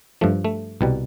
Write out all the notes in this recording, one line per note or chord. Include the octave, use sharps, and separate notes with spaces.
G2 F3 A3
A3
C2 B2 G3